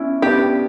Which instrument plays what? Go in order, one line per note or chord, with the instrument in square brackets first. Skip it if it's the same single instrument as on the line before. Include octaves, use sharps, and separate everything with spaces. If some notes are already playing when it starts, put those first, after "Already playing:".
Already playing: [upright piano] B3 C#4 D4 E4
[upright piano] B3 D4 [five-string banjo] G4